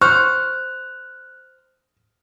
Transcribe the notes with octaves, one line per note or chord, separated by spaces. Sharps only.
C5 C#6 F6 F#6